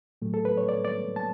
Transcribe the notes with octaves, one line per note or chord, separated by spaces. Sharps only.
A2 F#3 A3
A4
B4
C#5
D5
D5
A5